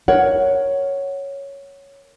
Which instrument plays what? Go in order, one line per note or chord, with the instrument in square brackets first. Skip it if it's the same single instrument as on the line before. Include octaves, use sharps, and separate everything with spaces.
[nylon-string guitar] A#4 C#5 F#5